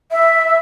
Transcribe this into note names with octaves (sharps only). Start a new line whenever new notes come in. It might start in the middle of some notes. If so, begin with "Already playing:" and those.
E5